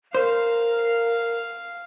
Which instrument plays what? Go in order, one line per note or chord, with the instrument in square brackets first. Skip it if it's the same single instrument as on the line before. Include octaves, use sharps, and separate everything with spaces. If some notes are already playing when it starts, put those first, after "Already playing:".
[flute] A#4 [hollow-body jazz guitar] C5 [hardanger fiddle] F5